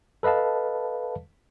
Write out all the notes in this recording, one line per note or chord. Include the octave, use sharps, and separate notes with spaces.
A4 B4 D#5 F5 A5